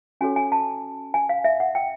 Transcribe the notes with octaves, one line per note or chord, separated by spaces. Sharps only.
C#4 F#4 A4 C#5 G#5
G#5
A5
G#5
F5
E5
F#5
G5